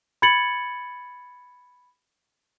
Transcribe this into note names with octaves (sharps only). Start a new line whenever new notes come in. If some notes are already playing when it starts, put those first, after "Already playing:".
B5 G#6 A6 C#7 F#7